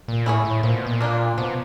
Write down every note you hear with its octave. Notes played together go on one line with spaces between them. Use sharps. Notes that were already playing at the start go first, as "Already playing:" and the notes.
A#2
A2 E4 G#4 C#5
A2
A#2 F3
B2
A#2
A#3 D4 F4
B2 F3